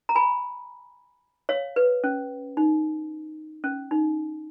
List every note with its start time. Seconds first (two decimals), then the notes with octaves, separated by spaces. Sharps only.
0.09 A#5
0.15 G#5 B5
1.49 C#5 F5
1.76 B4
2.04 C#4
2.57 D#4
3.64 C#4
3.91 D#4